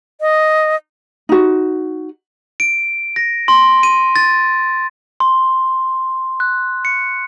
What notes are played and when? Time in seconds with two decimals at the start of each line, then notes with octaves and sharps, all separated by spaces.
0.21 D#5
1.29 D#4 F#4
2.60 D7
3.16 A#6
3.48 C6
3.83 D#7
4.16 A6
5.20 C6
6.40 F#6
6.85 C#7